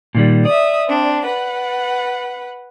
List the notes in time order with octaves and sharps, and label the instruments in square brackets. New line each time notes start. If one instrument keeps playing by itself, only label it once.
[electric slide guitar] A#2 D#3 G3
[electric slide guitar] D5 [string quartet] E5 D#6
[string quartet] C4 D4
B4 F#5